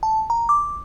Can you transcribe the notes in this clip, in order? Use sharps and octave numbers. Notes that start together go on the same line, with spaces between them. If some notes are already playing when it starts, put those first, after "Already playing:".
A5
A#5
D6